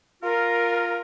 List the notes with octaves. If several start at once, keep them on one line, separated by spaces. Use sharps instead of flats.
F4 A#4